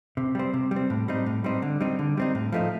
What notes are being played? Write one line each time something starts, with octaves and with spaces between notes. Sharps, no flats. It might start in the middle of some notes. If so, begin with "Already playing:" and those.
C3
G3 C4
C3
G3
C4
A2
G3 C4 D#4
A2
G3 C4 D#4
D3
G3 C4 D#4
D3
G3 C4 D#4
A2
F3 A3 C4 D#4